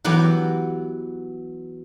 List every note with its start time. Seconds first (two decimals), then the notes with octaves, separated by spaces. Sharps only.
0.04 E3 F#3 B3 G4